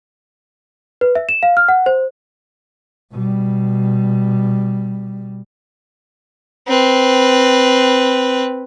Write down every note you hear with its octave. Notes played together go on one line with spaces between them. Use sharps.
B4
E5
E7
F5
F6
F#5
C5
B2 G3
C4 B4